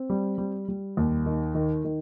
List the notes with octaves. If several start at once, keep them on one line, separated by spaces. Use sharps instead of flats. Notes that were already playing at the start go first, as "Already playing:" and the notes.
Already playing: C4
G3
G3
G3
D#2
D#3
D#3
D#3